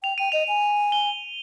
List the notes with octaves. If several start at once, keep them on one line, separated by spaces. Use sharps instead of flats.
G5 F7
G5 D#7
D#5 F7
G#5
G7